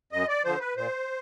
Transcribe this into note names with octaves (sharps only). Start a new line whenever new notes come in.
F#2 D#5
D5
D3 F3 C5
B4
A#2 C5